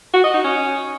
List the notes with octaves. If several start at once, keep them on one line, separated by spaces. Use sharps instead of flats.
F#4
D#5
D#4
C#4